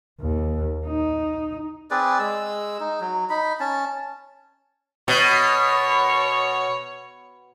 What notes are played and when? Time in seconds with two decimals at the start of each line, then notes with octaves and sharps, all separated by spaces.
0.20 D#2
0.86 D#4
1.91 C4 G#4 B4 D5
2.19 G#3 E6
2.80 D#4
3.00 F#3
3.30 D#4 B5
3.60 C#4 A5
5.08 B2 C#5